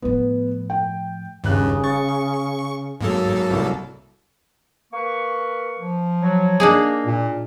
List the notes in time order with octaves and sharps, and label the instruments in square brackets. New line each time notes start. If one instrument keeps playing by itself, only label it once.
[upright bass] A2 F3 [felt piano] B3
[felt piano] G5
[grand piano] D#1 F#6 [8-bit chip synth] G2 [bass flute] C#3
[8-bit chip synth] C#6 [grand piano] A6
[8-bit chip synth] G#2 A#3 A4 [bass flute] F#3
[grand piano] C2
[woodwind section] A#3 B4 C#6
[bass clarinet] F3
[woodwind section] F#3
[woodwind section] A#3 [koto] D4 D#4 G#4
[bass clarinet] A#2